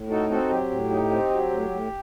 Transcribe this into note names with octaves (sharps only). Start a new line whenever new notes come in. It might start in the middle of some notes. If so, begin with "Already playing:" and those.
Already playing: A2
D#4 F#4 A4
C4 F#4 A4
F#3 G4
A2
D#4
C4
F#3
A2
A2